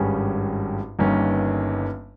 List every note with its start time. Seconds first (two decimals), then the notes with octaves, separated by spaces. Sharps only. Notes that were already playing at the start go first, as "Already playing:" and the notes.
Already playing: G#1 G2 G3 C#4 G#4
0.99 G1 G2 D#3 A#3 C#4